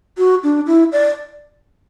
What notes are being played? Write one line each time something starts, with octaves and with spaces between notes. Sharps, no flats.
F#4
D4
E4
D5